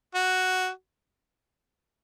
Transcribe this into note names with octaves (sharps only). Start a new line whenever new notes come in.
F#4